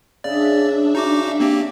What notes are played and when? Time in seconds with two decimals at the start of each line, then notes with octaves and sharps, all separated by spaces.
0.24 C#3 D4 D5 E5
0.95 D#4 F#4 D6
1.40 A#3 C4 G4